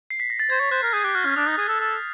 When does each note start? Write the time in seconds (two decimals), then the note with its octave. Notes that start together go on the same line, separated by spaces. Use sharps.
0.10 C7
0.20 B6
0.30 A#6
0.40 A6
0.50 C5 G#6
0.60 C#5
0.71 C5 F#6
0.83 A#4
0.93 G#4 G6
1.04 G4 F#6
1.15 F#4 F6
1.25 C#4 F6
1.36 D4 D#6
1.48 D#4
1.58 G#4
1.68 A4
1.80 A4